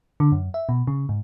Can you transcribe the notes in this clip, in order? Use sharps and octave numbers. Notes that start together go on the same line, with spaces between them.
D3
F#2
E5
B2
C#3
G#2